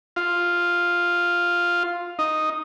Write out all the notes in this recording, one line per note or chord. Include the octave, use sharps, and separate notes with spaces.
F4
D#4